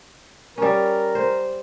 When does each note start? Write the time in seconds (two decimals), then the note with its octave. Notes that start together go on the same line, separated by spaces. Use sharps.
0.58 G3 C#4 A#4
1.15 C5